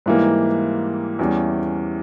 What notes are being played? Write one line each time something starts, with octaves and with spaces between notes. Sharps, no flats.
G#2 E3 G3 A#3
E2 E3 G3 C#4